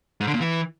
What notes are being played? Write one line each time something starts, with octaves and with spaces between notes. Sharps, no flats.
G#2
D3
A#2
E3